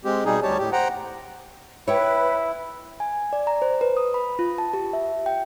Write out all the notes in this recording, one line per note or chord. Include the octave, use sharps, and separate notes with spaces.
G#3 C4 G4
B2 G3 D#4 G#4
D2 G3 G4 C#5 A5
A2 G4
C5 F#5 G5 A#5
E4 B4 C#5 G5
G#5
D5
A#5
C5
B4
D#6
B5
F4
A5
G4
E5
G5